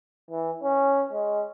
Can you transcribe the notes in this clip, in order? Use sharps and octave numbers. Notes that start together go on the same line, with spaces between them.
E3
C#4
G#3